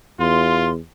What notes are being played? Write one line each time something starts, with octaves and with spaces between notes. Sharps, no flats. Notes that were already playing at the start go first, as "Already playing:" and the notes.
E2 F4 C6